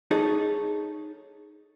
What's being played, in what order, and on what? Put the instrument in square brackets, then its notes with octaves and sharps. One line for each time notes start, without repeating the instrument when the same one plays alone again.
[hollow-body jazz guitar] D#4 G#4 A4 C#5